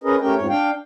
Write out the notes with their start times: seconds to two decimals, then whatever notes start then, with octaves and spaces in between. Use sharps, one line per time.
0.04 C#4 G#4 A#4 B4 D#5
0.21 A3 C#4 G4 A#4 G5
0.35 F2 G#2 C#5
0.49 D4 F5 G5